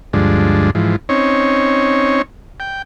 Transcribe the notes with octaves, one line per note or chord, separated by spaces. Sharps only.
D2 G2 F3 G#3 D4
G#2 E3 F3
C4 C#4 D#4 C#5
G5